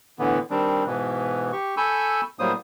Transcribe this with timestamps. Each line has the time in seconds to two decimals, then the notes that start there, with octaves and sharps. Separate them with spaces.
0.19 A2 D3 E3 B3
0.50 D#3 G3 C4 D4
0.86 G#2 B2 E3
1.53 G4 C#6
1.77 A4 G#5 B5 C#6 E6 G6
2.39 A2 F#3 G3 A#3 C5 D#6